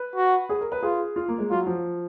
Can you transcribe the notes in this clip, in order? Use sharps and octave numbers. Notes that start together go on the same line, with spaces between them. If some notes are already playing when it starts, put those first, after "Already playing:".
Already playing: B4
F#4
G#4
A#4
B4
F4 G#4
F4
A#3
G#3
F#3 F4
F3